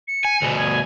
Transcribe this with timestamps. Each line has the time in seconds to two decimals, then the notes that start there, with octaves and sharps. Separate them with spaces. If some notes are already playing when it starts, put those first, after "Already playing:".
0.08 C#7
0.25 G#5
0.42 D2 B2
0.57 G#5